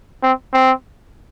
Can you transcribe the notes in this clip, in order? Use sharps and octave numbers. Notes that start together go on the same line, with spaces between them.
C4
C4